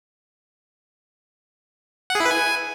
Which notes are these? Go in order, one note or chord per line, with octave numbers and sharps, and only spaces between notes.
F#5
G#4
E4
B4
G#5